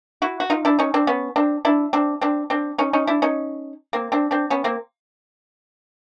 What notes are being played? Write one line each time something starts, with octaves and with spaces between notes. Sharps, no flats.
E4 F#4
F#4
D#4 F4
D4 E4
C#4 D#4
C4 D4
B3 C#4
C4 D4
D4 E4
C4 D4
C4 D4
C4 D4
C#4 D#4
C#4 D#4
D4 E4
C#4 D#4
A#3 C4
C4 D4
C4 D4
B3 C#4
A#3 C4